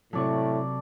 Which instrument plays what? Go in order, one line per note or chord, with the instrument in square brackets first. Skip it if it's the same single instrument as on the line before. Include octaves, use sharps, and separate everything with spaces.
[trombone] A2 [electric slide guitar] C3 F#3 [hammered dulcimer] A4 D5 C#6